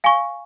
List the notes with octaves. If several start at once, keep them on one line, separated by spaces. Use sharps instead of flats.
F5 G#5 C#6